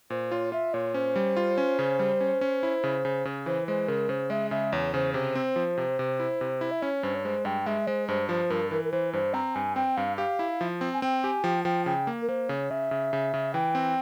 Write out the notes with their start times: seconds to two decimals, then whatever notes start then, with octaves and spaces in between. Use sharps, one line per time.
0.10 A#2 C5
0.31 F4 C#5
0.52 F4 E5
0.74 A#2 C#5
0.94 C#4 C5
1.16 G3
1.36 F4
1.58 C#4
1.79 C#3
1.99 G3
2.21 C#4
2.41 C#4
2.63 E4
2.84 C#3
3.05 C#3
3.25 C#3
3.46 E3 C5
3.68 G#3 C5
3.88 C#3 A#4
4.09 C#3 C5
4.30 G#3 E5
4.51 C#3 E5
4.72 E2 C#5
4.94 C#3 C5
5.14 C3 C5
5.35 C4
5.56 F3
5.78 C3
5.99 C3
6.20 E4
6.41 C3
6.61 E4
6.71 E5
6.82 C#4 C#5
7.03 G2 C5
7.15 C#5
7.25 G#3 C5
7.45 G2 G5
7.66 G#3 E5
7.87 G#3 C5
8.08 G2 C5
8.29 F3 C5
8.50 G2 A#4
8.71 E3 A#4
8.84 A#4
8.92 E3 C5
9.13 G2 C5
9.34 C4 A#5
9.55 G2 G#5
9.76 C4 G5
9.97 G2 F5
10.18 G4 F5
10.39 E4
10.61 F3
10.81 C4
10.94 G#5
11.02 C4 G5
11.24 G4 G#5
11.44 F3 G5
11.65 F3 G5
11.86 C#3 G5
12.07 A#3
12.22 A#4
12.28 A#3 C5
12.49 C#3 C#5
12.70 C#3 E5
12.91 C#3
13.13 C#3
13.34 C#3
13.54 E3 G5
13.75 C4